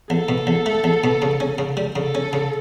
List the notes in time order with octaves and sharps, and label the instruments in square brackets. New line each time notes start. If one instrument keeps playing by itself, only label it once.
[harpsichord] E2 [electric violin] A4
[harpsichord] B2
E2
A3
E2
B2
C#3
C#4
C#3
G3
[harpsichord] C#3 [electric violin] A4
[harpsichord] C#4
C#3